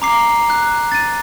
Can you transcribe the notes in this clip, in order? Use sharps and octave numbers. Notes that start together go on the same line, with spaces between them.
A#5 D6 C7
F#6
A6 D#7